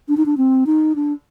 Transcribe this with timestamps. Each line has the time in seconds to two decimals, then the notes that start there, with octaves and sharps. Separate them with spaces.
0.08 D4
0.17 D#4
0.26 D4
0.37 C4
0.66 D#4
0.95 D4